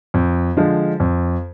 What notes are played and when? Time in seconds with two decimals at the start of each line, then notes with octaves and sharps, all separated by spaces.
0.14 F2
0.56 D3 F3 G#3
1.00 F2